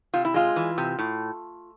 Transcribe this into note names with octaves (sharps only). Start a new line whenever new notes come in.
C3 F4
E4
G#3 F4
E3
C3
A2